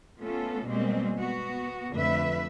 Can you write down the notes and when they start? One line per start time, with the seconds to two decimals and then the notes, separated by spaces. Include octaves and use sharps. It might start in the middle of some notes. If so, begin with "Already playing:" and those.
0.19 A3 B3 C#4 F4 A4
0.67 B2 G3 G#3 A#3 C4
1.19 B3 F#4
1.95 F2 D3 A3 B4 E5